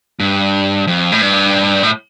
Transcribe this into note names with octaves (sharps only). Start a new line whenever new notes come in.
G2
F2
A2
G2
A2